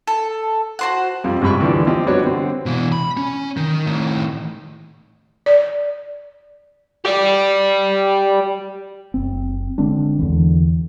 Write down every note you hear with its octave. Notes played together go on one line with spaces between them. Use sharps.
A4
F#4 C5 F#5
F2 F3 G3
G#2 C3 G3 B5 C#6
D2 E3 F3 D5
F3 C4 G4 D#5
G3 B3 D4 F#4 C#5
D3 C4
B2 E3
B5
C#4
D#3
A2 D#3
D5
G4 D5
F#1 C4
D3 G#3 C4 D4
E2 D3 E3